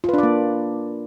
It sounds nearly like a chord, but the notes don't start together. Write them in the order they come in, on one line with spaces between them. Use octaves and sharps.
F4 B4 D4 D5 A#3